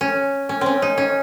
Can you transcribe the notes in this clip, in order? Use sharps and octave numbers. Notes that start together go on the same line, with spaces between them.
C#4
C#4
C4 C#4
D#4
C#4